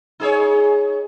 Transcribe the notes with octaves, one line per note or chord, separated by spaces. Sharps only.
D#4 G#4 C#5